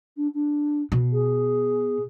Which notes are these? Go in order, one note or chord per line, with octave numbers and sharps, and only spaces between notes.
D4
D4
B2
G#4